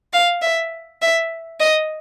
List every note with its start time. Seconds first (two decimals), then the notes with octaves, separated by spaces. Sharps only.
0.13 F5
0.42 E5
1.02 E5
1.60 D#5